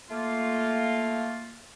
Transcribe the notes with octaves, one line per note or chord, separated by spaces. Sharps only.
A3 A#3 F4